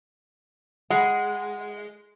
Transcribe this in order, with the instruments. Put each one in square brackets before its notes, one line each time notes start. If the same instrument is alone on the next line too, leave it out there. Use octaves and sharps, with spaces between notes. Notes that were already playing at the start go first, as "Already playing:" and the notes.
[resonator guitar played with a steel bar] G#3 [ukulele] F#5